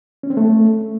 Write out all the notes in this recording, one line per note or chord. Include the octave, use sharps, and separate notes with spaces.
C#4
C4
A3